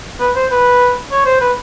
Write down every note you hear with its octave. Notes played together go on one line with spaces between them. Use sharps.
B4
C5
B4
C#5
C5
B4